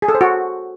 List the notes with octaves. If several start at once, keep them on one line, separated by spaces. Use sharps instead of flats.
G#4
A4
C5
F#4